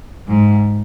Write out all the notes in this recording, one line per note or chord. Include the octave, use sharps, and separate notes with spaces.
G#2